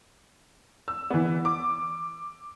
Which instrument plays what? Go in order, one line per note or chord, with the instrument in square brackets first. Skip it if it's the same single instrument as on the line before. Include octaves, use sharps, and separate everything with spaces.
[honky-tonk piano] E6
E3 B3
D6